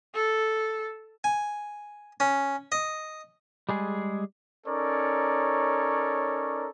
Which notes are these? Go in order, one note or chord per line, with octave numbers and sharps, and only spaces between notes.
A4
G#5
C#4
D#5
G3 G#3 G#4
C#4 D#4 A4 A#4 C#5 D5